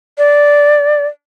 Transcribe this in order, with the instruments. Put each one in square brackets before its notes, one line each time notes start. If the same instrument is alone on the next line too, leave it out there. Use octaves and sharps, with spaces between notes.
[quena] D5